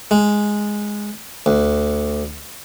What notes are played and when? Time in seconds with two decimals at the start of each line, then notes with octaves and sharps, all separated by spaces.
0.11 G#3
1.46 D2